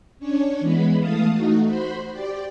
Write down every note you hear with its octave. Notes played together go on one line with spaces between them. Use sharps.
C#4 D4 C#5
E3 G#3 B3 B5
E3 A3 F5 A5 D#6
A3 D#4 F#4
F#4 C5 B5 C6
G4 D5